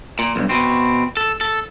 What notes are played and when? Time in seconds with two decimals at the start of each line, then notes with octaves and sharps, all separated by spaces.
0.19 A#2
0.36 B1 G2
0.49 B2 C4
1.17 A4
1.41 A4